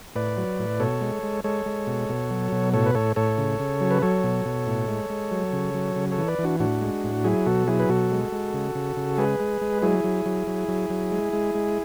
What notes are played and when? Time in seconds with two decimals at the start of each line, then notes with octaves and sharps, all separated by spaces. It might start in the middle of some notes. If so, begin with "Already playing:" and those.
0.15 A2 B4 D5
0.37 F#3
0.59 A2
0.80 B2 A4 C#5
1.01 G#3
1.23 G#3
1.44 G#3 A4 C#5
1.66 G#3
1.87 B2
2.09 B2
2.31 F#3
2.52 B2
2.73 A2 A4 C#5
2.86 B4
2.95 A2 A4 C#5
3.16 A2 A4 C#5
3.38 C#3
3.59 C#3
3.81 F#3
3.91 B4
4.02 F#3 A4 C#5
4.24 B2
4.45 B2
4.67 A2
4.88 G#3
5.10 G#3
5.31 F#3
5.53 C#3
5.74 F#3
5.96 C#3
6.11 A4 C#5
6.18 E3
6.28 B4 D5
6.39 E3
6.44 D4 F#4
6.60 A2 D4 F#4
6.81 G#3
7.04 A2
7.24 F#3 E4 G#4
7.46 B2 F#4 A4
7.68 F#3 E4 G#4
7.79 B4
7.89 B2 F#4 A4
8.11 G#3
8.32 G#3
8.54 C#3
8.75 C#3
8.97 C#3
9.18 G#3 G#4 B4
9.40 G#3
9.61 G#3
9.82 F#3 E4 G#4
10.04 F#3
10.26 F#3
10.47 F#3
10.68 F#3
10.90 F#3
11.11 G#3
11.33 G#3
11.55 G#3